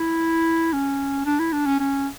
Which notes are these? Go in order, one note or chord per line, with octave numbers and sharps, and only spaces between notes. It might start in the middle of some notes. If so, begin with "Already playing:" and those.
Already playing: E4
C#4
D4
E4
D4
C#4
C#4